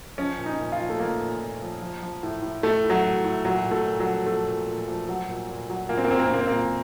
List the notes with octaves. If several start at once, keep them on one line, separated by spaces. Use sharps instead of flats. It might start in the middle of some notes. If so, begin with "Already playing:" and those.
F3 C#4
A#2
D#4
A#2
F4
F3
A3
F3 A#3
A#2
A#2
F3
F3
F3
A2
A2
A2 A3
A2
F#3
A2
A2
A#2 F#3
A#2
A3
A#2
F#3
F3
F3 A3
A#2
A#2
F3
F#3
A#2
A#2
F#3
A#2 A#3
C4
A#3
A#2 C4
A#3
C4
A#2 A#3
C4
A#2 A#3